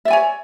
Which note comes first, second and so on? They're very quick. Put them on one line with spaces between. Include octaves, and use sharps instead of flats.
E5 D5 G#5 C#5